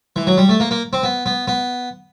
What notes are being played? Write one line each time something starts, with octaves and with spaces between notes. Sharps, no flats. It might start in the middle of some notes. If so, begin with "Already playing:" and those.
E3
F#3
G3
A3
A#3
A#3
C4
B3
B3
B3